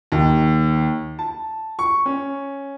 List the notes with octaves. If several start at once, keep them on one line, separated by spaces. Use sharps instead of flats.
D#2
A5
C#6
C#4